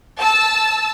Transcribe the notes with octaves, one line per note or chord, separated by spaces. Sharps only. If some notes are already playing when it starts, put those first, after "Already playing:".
A5 E6 A6